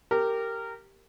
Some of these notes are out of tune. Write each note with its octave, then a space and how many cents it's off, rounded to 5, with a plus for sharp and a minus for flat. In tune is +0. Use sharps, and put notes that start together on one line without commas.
G4 +0 A#4 -15